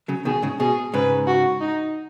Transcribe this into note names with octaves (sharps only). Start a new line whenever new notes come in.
C#3 F#3
B2 D#3 G#4
G#2 C#3
B2 G#4
G#2 C#3 B4
F#4
D#4